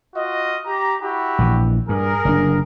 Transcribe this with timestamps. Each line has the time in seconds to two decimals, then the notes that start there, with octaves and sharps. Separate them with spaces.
0.15 F4 F#4 D#5
0.67 G4 A#5
1.02 E4 F#4 G4
1.39 A#1 E3
1.89 G2 G#4 A#4
2.25 F#1 D3 D4